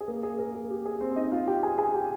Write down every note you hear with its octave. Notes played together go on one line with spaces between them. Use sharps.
G#4
A#3 A#4
G#4
A#3 A#4
G#4
G4
G#4
C4 C5
D#4 D#5
F4 F5
G4 G5
G#4 G#5
G#4 G#5
G4 G5